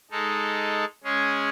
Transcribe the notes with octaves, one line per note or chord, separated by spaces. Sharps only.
G#3 D#4 A4
G#3 C#4 G#4 C#5